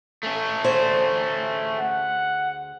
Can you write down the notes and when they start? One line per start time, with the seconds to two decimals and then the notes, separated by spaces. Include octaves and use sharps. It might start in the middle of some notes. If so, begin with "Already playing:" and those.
0.23 A3 C#4
0.64 D2 G#4 C5
1.79 F#5